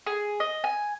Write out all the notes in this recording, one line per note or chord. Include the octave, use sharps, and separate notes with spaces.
G#4
D#5
G#5